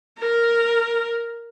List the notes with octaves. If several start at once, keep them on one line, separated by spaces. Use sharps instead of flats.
A#4